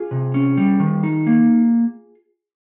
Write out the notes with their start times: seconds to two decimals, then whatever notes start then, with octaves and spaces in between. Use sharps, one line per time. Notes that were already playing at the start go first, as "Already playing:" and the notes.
Already playing: F4 G#4
0.11 C3
0.34 C#4
0.57 G3
0.80 D#3
1.03 D#4
1.27 A#3